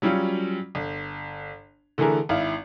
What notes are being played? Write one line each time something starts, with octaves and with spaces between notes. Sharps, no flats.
F#3 G3 C#4 F4
G1
D3 E3 A3 G#4 A#4
G#1 E4 F5